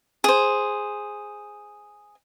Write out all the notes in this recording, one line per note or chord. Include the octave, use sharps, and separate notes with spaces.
G#4 C5